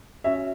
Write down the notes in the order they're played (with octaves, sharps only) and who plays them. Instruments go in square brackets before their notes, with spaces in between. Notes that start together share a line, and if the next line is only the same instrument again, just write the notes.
[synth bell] C#4 F#4 C#5 [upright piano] E5